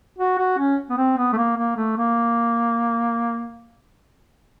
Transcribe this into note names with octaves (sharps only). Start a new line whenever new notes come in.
F#4
F#4
C#4
B3
C4
B3
A3
A#3
A#3
A3
A#3